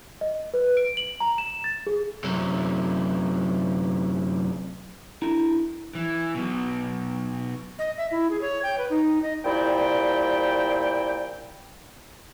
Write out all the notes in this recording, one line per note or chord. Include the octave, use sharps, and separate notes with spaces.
D#5
B4
D7
F#7
A#5
E7
A6
G#4
F#2 C3
D4 E4 A4 A#5
E3
B1 B2
D#5
E5
E4
G#4
C#5
G5
B4
D#4
D#5
C2 A#2 E4 G5